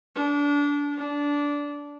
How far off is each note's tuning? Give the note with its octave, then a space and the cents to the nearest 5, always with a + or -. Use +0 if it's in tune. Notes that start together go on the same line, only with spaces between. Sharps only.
D4 -25
D4 -15